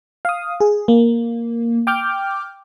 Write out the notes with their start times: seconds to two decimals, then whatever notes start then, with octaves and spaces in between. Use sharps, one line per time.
0.25 F5 D#6
0.60 G#4
0.88 A#3
1.87 G5 D6 F6 G6